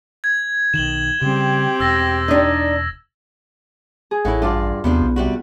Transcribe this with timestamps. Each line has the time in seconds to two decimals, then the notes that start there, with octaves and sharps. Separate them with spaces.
0.24 G#6
0.74 B1 D#3 E7 F#7 G7
1.21 C#3 G3 C4 G4
1.80 E1 E6 A6 A#6
2.28 D4 D#4
4.11 G#4
4.25 A1 A2 E4 F#5
4.42 G2 D4 F4 D5
4.84 D#2 C3 F3 B3 D4
5.00 B1
5.16 C3 G3 F#4